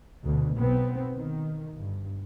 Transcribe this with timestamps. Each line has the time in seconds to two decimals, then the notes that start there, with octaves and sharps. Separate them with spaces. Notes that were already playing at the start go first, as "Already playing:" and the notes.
0.24 D2 B2
0.57 B1 B3 C4
1.15 D#3
1.73 G1 G2